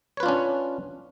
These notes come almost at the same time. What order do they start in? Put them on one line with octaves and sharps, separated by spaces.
C#5 B4 F4 D4 C#4